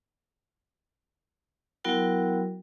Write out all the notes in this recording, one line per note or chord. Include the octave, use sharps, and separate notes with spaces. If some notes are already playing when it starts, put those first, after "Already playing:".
F#3 B3 E4 F#4 A#4 G5